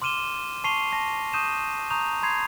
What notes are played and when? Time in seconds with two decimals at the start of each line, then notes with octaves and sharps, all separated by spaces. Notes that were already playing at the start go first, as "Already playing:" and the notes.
0.02 C6 D6 F6 D#7 E7 G7
0.64 A5 C#6 C7 D#7 F7 G7
0.92 A5 A#6 C7
1.33 C#6 D#6 G6 D#7 E7
1.90 A#5 C#6 D#6 G6 F7
2.22 B5 C6 G#6 C7 F7